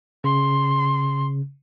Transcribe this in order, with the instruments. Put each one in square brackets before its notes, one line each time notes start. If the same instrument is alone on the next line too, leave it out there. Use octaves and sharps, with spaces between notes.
[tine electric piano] C#3 [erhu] C6